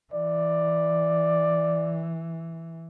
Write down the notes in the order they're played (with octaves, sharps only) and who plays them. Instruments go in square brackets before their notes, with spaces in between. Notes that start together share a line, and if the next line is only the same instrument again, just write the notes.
[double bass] E3 [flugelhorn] D5